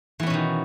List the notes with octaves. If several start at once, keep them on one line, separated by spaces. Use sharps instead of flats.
B2 D#3 E3 B3 C#4